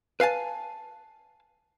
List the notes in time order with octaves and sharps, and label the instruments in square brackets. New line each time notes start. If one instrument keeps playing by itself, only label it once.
[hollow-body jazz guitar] B4 F5 G#5 A5